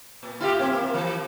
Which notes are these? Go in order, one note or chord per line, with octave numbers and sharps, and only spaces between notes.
A#2
E4 F4 G4
A#2 C4
A#3
E3